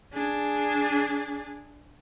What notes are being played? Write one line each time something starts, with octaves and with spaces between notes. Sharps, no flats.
D4 G#4